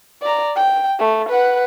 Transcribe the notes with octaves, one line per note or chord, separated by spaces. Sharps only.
D5 A#5
G5
A3
B4 F#5